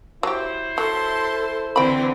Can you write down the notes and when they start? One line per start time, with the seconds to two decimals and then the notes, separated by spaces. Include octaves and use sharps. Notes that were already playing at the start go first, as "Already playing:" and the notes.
0.23 F#3 E4 G4 C5
0.78 F#3 A4 A5 C6
1.76 D3 E3 C4 G5 B5